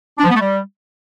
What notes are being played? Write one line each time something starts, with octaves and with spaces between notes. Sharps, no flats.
D4
F3
B3
A3
G3